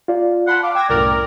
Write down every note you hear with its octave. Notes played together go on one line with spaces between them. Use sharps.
F4 D5
F#5 A5 B5 C6
F5 D6
G5 E6 G#6 A#6
C2 F#2 A2 A#4 D5